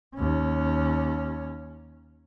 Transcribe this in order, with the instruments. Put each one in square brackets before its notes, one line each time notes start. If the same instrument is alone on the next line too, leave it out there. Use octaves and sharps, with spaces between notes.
[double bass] D#2 C#4